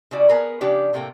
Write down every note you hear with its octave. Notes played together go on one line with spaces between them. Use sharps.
C#3 G3 E4 F#4 D5
B3 G#4 A#4 B4
C#3 F3 D4 G4 B4 D5
A2 C3 A3 A#3 G5